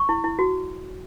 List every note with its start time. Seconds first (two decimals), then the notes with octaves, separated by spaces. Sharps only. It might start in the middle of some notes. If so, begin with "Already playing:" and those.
Already playing: C#6
0.09 E4
0.24 E4
0.39 F#4